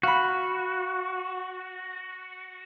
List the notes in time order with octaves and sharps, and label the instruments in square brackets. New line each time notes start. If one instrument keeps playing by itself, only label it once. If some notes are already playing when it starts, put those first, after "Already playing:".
[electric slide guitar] F#4 [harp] F5 B5